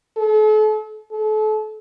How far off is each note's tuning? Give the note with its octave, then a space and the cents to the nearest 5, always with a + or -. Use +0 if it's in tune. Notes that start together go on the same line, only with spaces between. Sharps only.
A4 -40
A4 -35